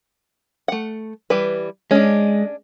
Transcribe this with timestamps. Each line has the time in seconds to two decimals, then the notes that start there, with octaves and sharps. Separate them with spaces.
0.68 A3 F#5
1.30 E3 G3 B4
1.91 G#3 C#4 D4